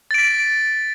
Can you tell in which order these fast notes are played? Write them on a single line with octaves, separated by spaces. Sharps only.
A6 D7 B6